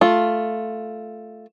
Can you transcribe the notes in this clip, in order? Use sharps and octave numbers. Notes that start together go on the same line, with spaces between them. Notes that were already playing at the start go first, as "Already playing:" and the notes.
A3 F4